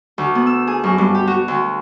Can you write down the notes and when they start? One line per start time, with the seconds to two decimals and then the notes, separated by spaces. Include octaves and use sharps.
0.18 D2
0.35 B3
0.47 E6
0.67 G#4
0.84 F#2
0.98 G2
1.15 G4
1.27 F#4
1.48 D2